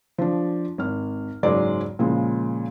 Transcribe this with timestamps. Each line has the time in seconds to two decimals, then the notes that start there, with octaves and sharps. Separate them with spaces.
0.18 F3 D4
0.78 G#1 F6
1.43 F#1 G#2 F#3 G#3 D5
1.99 A#2 C#3 F3 G#3